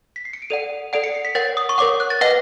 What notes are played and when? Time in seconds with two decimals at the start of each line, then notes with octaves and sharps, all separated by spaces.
0.16 B6
0.25 C7
0.33 C#7
0.42 D7
0.50 A4 D5 F#5 D#7
0.93 A4 D5 F#5 D7
1.04 C#7
1.15 C7
1.25 B6
1.35 A#4 C#5 F#5 A6
1.57 D#6
1.69 C#6
1.78 A#4 C#5 F#5 D6
2.00 F#6
2.10 A6
2.21 B4 D#5 F#5 A#6